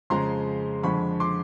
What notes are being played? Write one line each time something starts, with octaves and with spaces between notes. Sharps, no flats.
F2 C#3 F3 G#3 A#5 C6
F2 D3 F3 G#3 B5 C#6
C6 D6